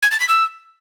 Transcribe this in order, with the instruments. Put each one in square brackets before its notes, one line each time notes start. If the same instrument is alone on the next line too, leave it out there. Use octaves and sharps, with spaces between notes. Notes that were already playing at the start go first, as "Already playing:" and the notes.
[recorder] G#6
A6
B6
E6